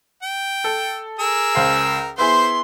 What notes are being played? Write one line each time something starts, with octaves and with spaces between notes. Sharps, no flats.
G5
A4
G#4 A#4 E6
C#2 C5 F5
B3 E4 G#4 C5 C6